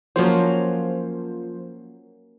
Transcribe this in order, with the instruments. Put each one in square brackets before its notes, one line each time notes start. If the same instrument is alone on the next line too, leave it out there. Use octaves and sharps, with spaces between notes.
[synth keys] F3 C5 [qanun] F#3 A#3 C#4